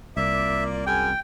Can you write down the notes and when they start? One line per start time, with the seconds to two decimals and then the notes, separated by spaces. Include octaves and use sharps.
0.17 C2 A#3 F4 D5 E5
0.87 F#2 G#4 G5 G#5